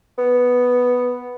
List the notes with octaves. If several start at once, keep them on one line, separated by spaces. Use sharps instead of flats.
B3